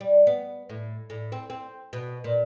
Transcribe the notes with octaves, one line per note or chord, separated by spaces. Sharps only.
G3
B3
A2
A2
C4
C4
B2
A#2